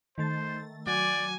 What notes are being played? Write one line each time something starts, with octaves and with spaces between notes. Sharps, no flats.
D#3 A3 C5 A6
F#3 F#4 D5 G#5 D6